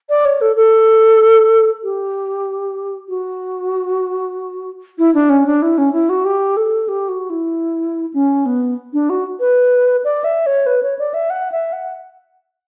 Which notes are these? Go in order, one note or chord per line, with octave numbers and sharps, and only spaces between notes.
D5
C#5
A4
A4
G4
F#4
E4
D4
C#4
D4
E4
C#4
E4
F#4
G4
A4
G4
F#4
E4
C#4
B3
D4
F#4
B4
D5
E5
C#5
B4
C#5
D5
E5
F#5
E5
F#5